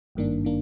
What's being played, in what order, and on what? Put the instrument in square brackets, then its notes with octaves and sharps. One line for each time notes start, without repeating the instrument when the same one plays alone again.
[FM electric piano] G#1 G2 D#3 A#3 D4
D#3 A#3 D4